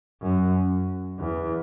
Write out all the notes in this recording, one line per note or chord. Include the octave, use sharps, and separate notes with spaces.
F#2
E2